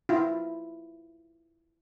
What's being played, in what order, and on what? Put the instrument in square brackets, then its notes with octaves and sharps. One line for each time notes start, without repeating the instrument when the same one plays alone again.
[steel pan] E4 F4